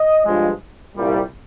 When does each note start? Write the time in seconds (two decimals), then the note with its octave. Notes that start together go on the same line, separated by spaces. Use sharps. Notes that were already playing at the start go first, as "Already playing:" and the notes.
Already playing: D#5
0.25 G2 F3 G#3
0.96 C2 A#2 G3